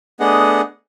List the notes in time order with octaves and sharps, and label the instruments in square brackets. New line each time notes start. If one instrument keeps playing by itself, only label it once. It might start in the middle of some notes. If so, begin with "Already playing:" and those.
[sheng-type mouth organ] A3 B3 D4 G#4 D#5 F#5